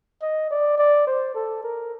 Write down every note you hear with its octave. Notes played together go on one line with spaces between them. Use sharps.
D#5
D5
D5
C5
A4
A#4